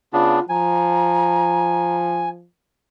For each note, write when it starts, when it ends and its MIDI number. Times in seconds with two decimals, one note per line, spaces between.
0.13 0.39 49
0.13 0.39 59
0.13 0.39 62
0.13 0.47 65
0.49 2.45 53
0.49 2.29 80
0.49 1.96 82